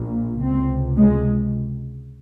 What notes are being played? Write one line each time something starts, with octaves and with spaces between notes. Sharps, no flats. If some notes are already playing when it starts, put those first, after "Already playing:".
Already playing: A#1 A#2
C#2 C3 C4
G#3